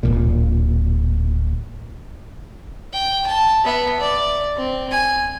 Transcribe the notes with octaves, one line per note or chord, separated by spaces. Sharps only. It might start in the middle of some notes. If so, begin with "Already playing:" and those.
D1 G1 A#2
G5
A5
B3 E5
D5
C4
G#5